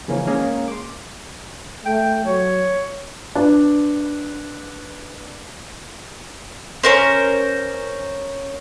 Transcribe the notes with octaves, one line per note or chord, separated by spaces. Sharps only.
C#3 E3 F3 A#3 C#4
G#3 A#3 C#4 G#4
C6 D6
A3 G5
F#3 C#5
D4 B4
C#4 A#4 C5